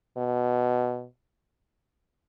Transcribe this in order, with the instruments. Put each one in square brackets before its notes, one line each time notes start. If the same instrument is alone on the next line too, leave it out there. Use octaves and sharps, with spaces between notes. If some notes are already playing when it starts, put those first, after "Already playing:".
[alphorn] B2